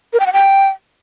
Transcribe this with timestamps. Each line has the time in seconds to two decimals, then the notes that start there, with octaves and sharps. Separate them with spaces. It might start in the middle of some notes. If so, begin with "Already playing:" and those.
0.13 A#4
0.20 G5
0.26 F#5
0.33 G5